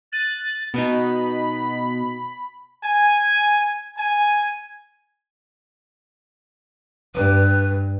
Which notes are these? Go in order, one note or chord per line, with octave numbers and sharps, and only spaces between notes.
F#6 A6 D#7
B2 B3 D#4 B5
G#5
G#5
G2 B4